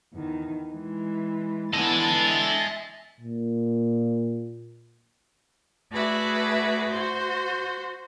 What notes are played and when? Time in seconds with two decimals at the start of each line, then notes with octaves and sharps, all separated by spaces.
0.13 E2 D#3
0.72 E3 G#3
1.74 E3 B3 D4 A4 D#5 G#5 A6
2.25 E5
3.20 A#2
5.92 A3 F#4 G#4 B4 D5 E5
6.91 F#4 C5